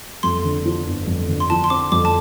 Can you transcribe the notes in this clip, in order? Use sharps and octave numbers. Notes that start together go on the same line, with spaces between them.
F2 C6
D3
F3
G1
F2
D3
C6
F3 A5
C6
C4 D6
F2 D6
A5